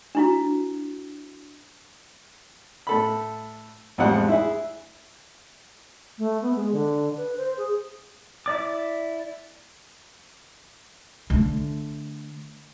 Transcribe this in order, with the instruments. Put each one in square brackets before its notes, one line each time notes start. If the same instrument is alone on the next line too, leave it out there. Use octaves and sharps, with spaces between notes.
[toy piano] D4 E4 F#4
[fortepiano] A2 A4 B5
A1 F2 A2 G3 G#3 F#5
E4 G#4
[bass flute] A3
B3
G#3
D3
B4
C5
G#4
[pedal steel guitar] E4 D5 D6
[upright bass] D3 A3